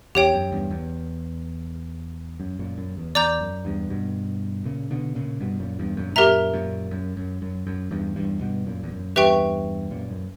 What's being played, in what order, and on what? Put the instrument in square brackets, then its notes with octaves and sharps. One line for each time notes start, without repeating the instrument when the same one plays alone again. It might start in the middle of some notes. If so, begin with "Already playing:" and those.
[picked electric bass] E2 [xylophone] G4 C#5 G5
[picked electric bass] F#2
E2 G2
E2
F#2
F#2 A#2
F#2
E2
[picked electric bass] E2 [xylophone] D5 A#5 D6 G6
[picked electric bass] F#2
E2 G2
G2 B2
A#2 C#3
B2 D3
A#2 C#3
G2 B2
F#2 A#2
E2 G2
F#2 A#2
G2
[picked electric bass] F#2 A#2 [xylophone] G4 A#4 E5 A#5
[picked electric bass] F#2 A#2
F#2
F#2
F#2
F#2
E2 G2
E2 G2
G2 B2
F#2 A#2
E2
F#2
[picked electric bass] E2 G2 [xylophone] G4 B4 E5 G5 C#6
[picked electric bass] F#2 A#2
F#2